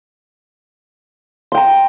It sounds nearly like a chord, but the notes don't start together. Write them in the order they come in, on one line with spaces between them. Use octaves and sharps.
C6 G5 A#5